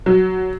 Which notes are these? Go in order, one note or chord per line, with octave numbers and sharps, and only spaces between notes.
F#3